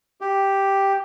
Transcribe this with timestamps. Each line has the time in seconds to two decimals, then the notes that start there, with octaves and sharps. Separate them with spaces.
0.21 G4